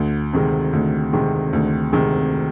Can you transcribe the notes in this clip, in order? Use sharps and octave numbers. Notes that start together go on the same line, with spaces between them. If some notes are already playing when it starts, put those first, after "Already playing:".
Already playing: D2
C3 D#3 G#3
D2
C3 D#3 G#3
D2
C3 D#3 G#3